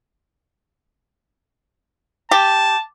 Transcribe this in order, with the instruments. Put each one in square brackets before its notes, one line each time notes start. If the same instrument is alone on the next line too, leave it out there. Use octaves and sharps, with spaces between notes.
[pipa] G4 [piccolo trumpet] A5